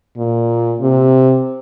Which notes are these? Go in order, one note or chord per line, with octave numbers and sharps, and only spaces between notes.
A#2
C3